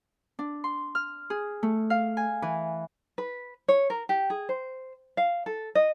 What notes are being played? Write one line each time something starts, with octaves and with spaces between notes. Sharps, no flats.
D4
C6
F6
G#4
A3
F5
G#5
E3
B4
C#5
A#4
G4
G#4
C5
F5
A4
D#5